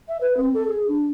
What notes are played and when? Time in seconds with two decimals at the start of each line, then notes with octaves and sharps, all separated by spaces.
0.08 E5
0.21 B4
0.37 C4
0.54 A4
0.67 G#4
0.88 D4